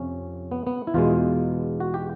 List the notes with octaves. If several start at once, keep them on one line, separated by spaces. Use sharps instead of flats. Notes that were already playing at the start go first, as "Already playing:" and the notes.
Already playing: F2 C3 F3 C#4
B3
B3
E4
E2 B2 G#3 F4
F#4
G4